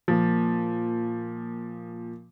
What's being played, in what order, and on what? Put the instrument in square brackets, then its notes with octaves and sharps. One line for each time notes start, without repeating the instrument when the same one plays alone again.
[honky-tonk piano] A#2 F3